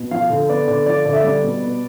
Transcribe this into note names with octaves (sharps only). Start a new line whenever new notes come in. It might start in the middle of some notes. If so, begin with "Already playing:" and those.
Already playing: B2
F3 F5
D3
B3 D5
D3 D5
F3 D5
D3 D5
E5
G3 D5
B2
B3